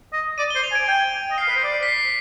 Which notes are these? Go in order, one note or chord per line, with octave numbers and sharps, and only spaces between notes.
D#5
D5 D#7
G7
C5
F7
G#5
D7
G#5
G5
D#5
F5 C7
B4
C5
D5
B6
C7